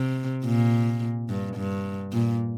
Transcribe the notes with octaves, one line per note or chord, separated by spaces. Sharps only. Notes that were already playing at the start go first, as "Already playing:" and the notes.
Already playing: C3
A#2
G2
G2
A#2